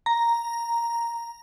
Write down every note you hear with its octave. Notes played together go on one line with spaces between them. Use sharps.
A#5